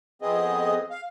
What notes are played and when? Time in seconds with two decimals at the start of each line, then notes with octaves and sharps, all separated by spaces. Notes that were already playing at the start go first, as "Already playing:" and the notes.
0.22 F2 B3 C4 G#4 D#5
0.91 F5